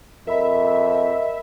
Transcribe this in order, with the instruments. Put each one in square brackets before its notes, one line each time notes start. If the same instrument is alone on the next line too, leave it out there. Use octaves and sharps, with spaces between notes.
[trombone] F2 [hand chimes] A#4 B5 [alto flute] D#5 [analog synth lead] E5